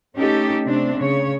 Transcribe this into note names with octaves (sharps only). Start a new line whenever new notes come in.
A3 C#4 D#4 G4 A4
C3 A3 C4 D4
C#3 C#5